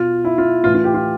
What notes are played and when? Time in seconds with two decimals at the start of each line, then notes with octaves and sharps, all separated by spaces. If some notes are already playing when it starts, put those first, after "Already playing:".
Already playing: B2 F4
0.25 E4
0.38 F4
0.64 A2 E3 F4
0.75 F4
0.84 G4
0.94 F4